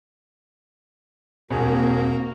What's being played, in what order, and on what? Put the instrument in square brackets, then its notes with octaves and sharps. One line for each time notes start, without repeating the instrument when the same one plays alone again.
[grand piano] E1 C2 G#4 [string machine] A#3 [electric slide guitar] C4 [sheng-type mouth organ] F#4 A#4 A#5